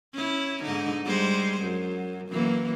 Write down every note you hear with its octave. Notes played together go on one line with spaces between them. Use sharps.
C#4 E4
G#2 D3 D#4
G3 G#3 C5
F#2
F#2 E3 A#3